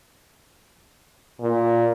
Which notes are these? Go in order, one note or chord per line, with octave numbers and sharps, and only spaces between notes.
A#2